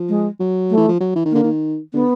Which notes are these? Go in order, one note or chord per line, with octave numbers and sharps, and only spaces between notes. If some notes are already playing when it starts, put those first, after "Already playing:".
Already playing: F3
G#3
F#3
A3
E3
F3
F#3
E3
D#3
D3 A#3
D#3
D3 B3